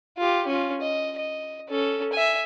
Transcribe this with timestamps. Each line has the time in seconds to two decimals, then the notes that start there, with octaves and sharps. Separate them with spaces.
0.18 F4 G4
0.47 C#4 F4
0.81 D#5
1.19 D#5
1.70 C#4 A4
2.13 E5 G#5